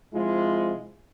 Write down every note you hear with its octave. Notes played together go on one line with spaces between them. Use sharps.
C3 F3 G#3 E4 F4